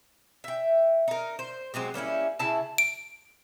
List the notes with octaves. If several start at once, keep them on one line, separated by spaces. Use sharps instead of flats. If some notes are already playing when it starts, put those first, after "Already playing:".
E5 G5
D#4 A#4
C5
F#3 G#3 C4 G4
G3 A#3 C#4 E4
C#3 E4 A5
D7